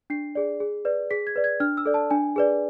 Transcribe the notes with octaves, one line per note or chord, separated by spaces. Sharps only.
D4 C7
G#4 D5
G#4
B4 D5
G#4 B6
G#6
B4 D5
G#6
D4 F6
E6
A4 D5
A5
D4 G#5
G#4 B4 D5